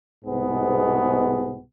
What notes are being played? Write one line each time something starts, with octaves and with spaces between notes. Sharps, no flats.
C2 G#2 B2 B3 G#4